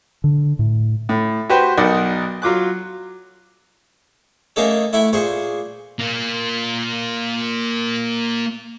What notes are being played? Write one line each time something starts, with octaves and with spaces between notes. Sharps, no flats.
D3
A2
A2
F#4 G4 B4 C5 G5
B1 D#4 A#4 D5 F#5
F#3 F4 D6 F#6
A3 A#3 C#4 D#4 G#4 A4
A3 E4 E5 F#5 G#5
A#2 G#4 C5 G#5 C#6
A#3 F4